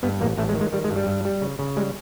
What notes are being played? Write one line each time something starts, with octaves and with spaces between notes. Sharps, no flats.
G2 B3
A1 A#3
A1 A3
G#3
D#3
G#3
D#3 G3
G#3
G2
G3
G2
G3
C#3
C#3
G3 G#3